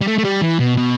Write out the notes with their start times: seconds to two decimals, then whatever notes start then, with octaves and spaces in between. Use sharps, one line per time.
0.01 G3
0.08 A3
0.18 A3
0.25 G3
0.42 E3
0.59 B2
0.77 B2